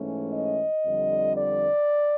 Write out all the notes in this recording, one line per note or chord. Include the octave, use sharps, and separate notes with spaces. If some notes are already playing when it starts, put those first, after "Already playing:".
Already playing: G#2 E3 A3 C#4
D#5
F2 D3 G3
D5